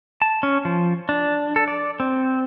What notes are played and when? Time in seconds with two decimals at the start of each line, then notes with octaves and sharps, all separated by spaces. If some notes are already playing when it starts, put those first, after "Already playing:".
0.22 A5
0.43 C#4
0.65 F3
1.09 D4
1.56 A4
1.68 D5
2.00 C4